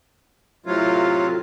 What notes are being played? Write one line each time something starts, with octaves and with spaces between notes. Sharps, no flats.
A2 C3 F#3 F4